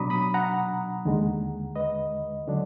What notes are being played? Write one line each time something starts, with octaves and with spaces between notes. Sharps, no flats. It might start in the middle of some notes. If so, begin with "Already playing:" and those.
Already playing: B2 F#3 D4 A#5 B5 D6 D#6
B5 D#6
F#5 A#5
D#2 D3 G#3
B4 D#5
D3 F#3 D4